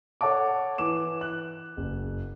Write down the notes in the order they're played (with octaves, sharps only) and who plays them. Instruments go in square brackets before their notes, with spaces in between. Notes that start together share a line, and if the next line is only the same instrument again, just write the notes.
[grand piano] A4 C#5 F#5 A5 D6
E3 D6 E7
F#6
F#1